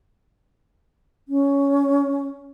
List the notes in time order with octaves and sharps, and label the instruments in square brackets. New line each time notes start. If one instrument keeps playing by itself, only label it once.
[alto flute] C#4